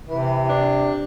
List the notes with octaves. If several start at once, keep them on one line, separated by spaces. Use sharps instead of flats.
C3 E3
D4